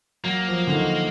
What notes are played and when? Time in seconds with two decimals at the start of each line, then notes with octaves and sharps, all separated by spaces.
0.24 F#3 A#3
0.48 F3
0.67 D3
0.72 D#3